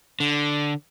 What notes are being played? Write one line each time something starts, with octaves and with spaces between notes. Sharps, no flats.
D3